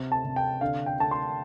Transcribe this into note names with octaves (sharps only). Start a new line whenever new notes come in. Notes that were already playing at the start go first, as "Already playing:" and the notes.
Already playing: C3
A5
C3
G5
D3 F5
G5
D3 A5
C6